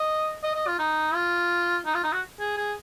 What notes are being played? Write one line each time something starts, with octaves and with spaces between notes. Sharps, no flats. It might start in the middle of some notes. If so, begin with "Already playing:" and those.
Already playing: D#5
D#5
D#5
F4
D#4
F4
D#4
F4
D#4
F#4
G#4
G#4